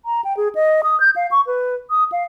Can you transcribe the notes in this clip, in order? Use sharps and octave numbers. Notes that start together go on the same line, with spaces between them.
A#5
G5
G#4
D#5
D#6
G6
F5
C#6
B4
D#6
F5